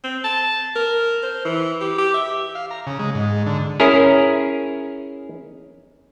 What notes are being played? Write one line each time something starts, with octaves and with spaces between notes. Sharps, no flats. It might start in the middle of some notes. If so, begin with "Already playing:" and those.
C4
A5
A#4
C5
E3
G4
G4
E5
F5
A#5
C#3
G#3
G#2
D3
C#4 E4 G#4 A#4